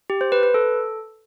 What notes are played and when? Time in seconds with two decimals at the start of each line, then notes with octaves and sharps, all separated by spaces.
0.10 G4
0.21 C5
0.32 B4
0.43 B4
0.54 A4